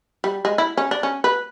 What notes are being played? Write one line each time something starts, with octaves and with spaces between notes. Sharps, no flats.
G3
G#3
E4
C#4
D4
C#4
B4